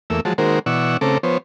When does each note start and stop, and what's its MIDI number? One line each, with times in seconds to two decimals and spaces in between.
0.10 0.20 40
0.10 0.20 57
0.10 0.20 58
0.10 0.20 88
0.25 0.33 53
0.25 0.33 54
0.25 0.33 56
0.25 0.33 81
0.38 0.59 51
0.38 0.59 56
0.38 0.59 58
0.38 0.59 66
0.38 0.59 70
0.38 0.59 72
0.66 0.97 47
0.66 0.97 52
0.66 0.97 74
0.66 0.97 78
0.66 0.97 85
0.66 0.97 88
1.01 1.18 49
1.01 1.18 57
1.01 1.18 60
1.01 1.18 69
1.01 1.18 82
1.01 1.18 86
1.23 1.38 53
1.23 1.38 59
1.23 1.38 72
1.23 1.38 73